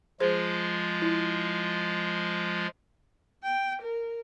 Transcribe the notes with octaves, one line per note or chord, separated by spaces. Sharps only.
F3 G#3 F4 G#4 C5
E4
G5
A#4